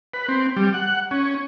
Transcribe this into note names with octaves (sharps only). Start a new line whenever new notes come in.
B4
C4
G3
F#5
C#4